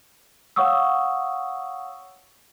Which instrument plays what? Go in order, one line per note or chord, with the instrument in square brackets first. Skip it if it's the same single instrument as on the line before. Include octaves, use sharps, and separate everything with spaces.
[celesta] C#5 F5 F#5 C#6 D#6 E6